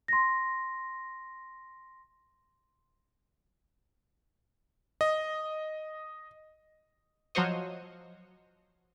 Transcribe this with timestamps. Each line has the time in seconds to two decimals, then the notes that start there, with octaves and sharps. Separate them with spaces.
0.08 C6 A#6
5.01 D#5
7.35 F3 F#3 F#4 C5 C#5 D#5